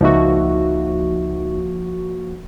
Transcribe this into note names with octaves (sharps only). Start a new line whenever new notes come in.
C#2 F3 A#3 D#4 F#4 E5